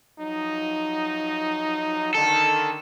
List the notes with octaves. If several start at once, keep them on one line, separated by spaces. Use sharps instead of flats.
F3 F#3 D#4
D3 D#3 A4